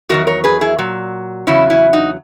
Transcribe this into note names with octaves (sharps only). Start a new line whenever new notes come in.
E2 D#3 F#3 F#4 A#4
A#4 C#5
G#4 B4
E4 G#4
A#2 F#3
E2 C#3 F#3 C#4 E4
C#4 E4
D#4 F#4